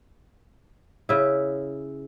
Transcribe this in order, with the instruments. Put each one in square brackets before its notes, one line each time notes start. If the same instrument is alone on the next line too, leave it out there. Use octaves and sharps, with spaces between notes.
[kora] C#3 E4